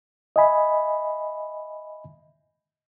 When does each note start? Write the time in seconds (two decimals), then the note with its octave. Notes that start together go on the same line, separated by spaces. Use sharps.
0.36 D#5 E5 G#5 B5